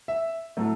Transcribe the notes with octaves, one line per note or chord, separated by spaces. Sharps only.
E5
A2 F#3 A3